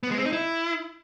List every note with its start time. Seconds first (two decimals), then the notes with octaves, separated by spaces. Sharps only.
0.03 B3
0.11 G#3
0.18 C4
0.25 D#4
0.32 E4